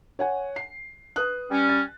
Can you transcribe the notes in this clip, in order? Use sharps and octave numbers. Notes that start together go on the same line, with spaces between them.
C#5 F#5 G#5
C7
B4 D#6 F#6
G3 C#4
A6